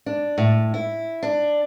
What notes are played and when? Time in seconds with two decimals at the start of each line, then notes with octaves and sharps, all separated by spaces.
0.06 D4
0.38 A2
0.74 E4
1.23 D4